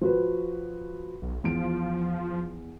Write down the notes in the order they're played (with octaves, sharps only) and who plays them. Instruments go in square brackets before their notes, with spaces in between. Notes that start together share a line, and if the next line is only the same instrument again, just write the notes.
[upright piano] F3 F#4 B4
[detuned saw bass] B1
[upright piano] E2 D7 [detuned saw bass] F3